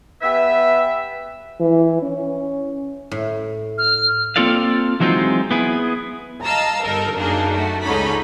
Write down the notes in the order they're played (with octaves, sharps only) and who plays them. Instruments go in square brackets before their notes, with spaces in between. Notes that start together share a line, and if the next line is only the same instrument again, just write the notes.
[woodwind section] B3 G4 B4 E5
[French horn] E3
C#4
[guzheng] A2
[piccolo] F6
[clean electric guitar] A#3 C4 F4 A4 D5 F5
E3 F#3 G#3 C4 D#4 F4
B3 E4 G#4
[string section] D#5 F5 A5 A#5 E6
G1 D#4 A4 A#4
F#2 A#3 D4 D#4 G#4
A3 F#4
C#2 G#2 D3 C#4 D#4 B5